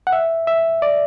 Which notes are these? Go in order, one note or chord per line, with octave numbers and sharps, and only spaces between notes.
F#5
E5
E5
D5